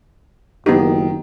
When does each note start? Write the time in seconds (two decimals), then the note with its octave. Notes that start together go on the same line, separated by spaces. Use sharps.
0.66 F#1 D#3 B3 G4